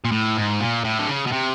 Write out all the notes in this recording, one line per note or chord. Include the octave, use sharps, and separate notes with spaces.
A#2
A2
G#2
A#2
A2
D3
C#3
B2
C3